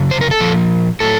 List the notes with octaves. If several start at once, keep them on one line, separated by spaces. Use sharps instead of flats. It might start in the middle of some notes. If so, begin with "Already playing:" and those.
Already playing: F#2 C#3
C5
A#4
A4
A#2 F3
A2 F#3 A4